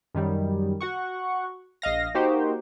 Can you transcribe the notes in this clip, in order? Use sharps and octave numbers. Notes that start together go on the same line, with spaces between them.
F#2 D#3 G3
F#4 F#5 C#6
A#1 D#5 F5 A#6
A#3 D#4 F#4 G4 C5